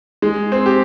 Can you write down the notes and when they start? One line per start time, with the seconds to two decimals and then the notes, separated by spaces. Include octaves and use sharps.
0.22 G#3
0.52 C4
0.66 G4